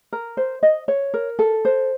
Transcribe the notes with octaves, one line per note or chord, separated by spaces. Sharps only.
A#4
C5
D#5
C#5
A#4
A4
C5